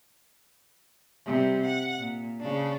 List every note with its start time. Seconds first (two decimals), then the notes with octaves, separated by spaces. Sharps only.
1.26 C3 G3
1.65 F#5
1.98 A#2
2.41 C#3 D4